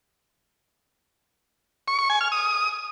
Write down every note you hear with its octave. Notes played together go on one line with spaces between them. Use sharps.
C#6
C#6
G#5
F6
D#6